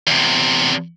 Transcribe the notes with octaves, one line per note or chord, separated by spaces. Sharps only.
E2 C3